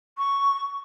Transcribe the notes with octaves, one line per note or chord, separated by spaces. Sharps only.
C#6